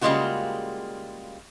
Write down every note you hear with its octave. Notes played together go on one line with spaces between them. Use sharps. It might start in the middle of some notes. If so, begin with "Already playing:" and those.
C#3 G3 G#3 A#3 F4 F#4